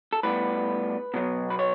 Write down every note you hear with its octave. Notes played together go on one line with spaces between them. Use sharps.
A4
A2 G3 B3 B4
B2 F#3 B3
B4
C#5